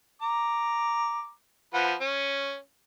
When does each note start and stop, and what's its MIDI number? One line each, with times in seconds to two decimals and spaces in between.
0.22 1.30 82
0.22 1.30 86
1.74 1.94 53
1.74 1.94 71
1.74 1.94 78
2.00 2.56 61